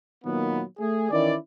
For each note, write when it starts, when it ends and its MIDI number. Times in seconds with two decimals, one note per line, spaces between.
0.23 0.61 46
0.23 0.61 51
0.23 0.61 54
0.23 0.61 58
0.23 0.61 59
0.79 1.08 57
0.79 1.08 68
1.10 1.34 51
1.10 1.34 52
1.10 1.34 61
1.10 1.34 64
1.10 1.34 74